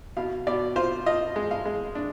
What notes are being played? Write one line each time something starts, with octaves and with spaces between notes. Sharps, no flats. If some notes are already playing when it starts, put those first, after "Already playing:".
B2 F5
B2 D5
F4 C5
F4 D#5
G#3
F5
G#3
D4